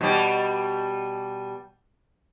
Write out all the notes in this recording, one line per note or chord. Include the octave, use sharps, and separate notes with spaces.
B2 G3